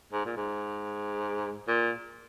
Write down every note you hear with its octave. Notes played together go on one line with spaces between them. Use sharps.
G#2
A#2
G#2
A#2